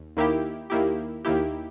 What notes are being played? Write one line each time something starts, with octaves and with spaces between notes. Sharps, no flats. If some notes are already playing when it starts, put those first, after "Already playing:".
Already playing: D#2
D#2 D#3 A#3 E4 G4
D#2 D#3 A#3 E4 G4
D#2 D#3 A#3 E4 G4